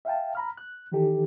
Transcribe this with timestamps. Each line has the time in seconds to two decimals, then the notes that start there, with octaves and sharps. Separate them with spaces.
0.05 E5 F5 G5 A5
0.35 A#5 B5 F6
0.57 F#6
0.92 D#3 E3 D#4 G4 A4